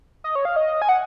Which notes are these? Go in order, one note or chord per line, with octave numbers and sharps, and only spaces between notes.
D#5
C#5
F5
D#5
G#5
F#5